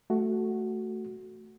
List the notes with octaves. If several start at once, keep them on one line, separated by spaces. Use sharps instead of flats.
A3 F#4